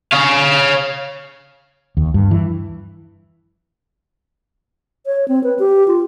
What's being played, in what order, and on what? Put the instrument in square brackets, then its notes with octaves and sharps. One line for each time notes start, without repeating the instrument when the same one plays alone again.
[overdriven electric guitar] C#5 F5
[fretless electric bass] D#2
G2
E3
[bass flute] C#5
C4
B4
G4
F4